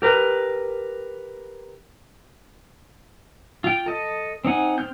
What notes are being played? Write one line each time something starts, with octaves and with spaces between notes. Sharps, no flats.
G4 A#4 B4
F4 G5
A4 D#5
C4 D#4 F#5 G#5
C4 F6 G6